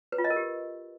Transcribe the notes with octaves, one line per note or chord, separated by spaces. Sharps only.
B4
F4
D#5
A#4
G4